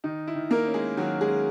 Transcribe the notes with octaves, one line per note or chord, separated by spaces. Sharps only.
D#3 D#4
E4
D#3
A#3 A#4
C#4
G#3 G#4
D#3 F#3 F#4
G#3 G#4
C#4